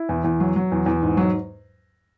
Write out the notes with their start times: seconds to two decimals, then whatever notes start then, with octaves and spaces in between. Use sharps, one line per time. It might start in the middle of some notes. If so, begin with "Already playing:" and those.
Already playing: E4
0.09 E2
0.24 E2
0.40 F#3
0.56 F#3
0.72 E2
0.86 E2
1.03 G#2
1.17 F#3